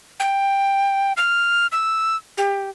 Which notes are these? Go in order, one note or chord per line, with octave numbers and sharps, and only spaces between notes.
G5
F6
E6
G4